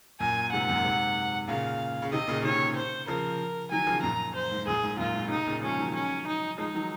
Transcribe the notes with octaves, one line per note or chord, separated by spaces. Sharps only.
F#2 A#2 G#5
G#2 C3 F#5
F#2 A#2
G#2 C3
A#2 C#3 F5
C#3
C3 D#3 D#5
A#2 C#3
C3 D#3 C#5
C5
C#3 F3 A#4
D#3 F#3 G#5
C#3 F3
F#2 A#2 A#5
C5
G#2
F#2 A#2 G#4
G#2
F#2 A#2 F4
G#2
C#3
G#2 C3 D#4
A#2 C#3
F3 G#3 C#4
D#3 F#3
C#4
D#4
F3 G#3 D#4
D#3 F#3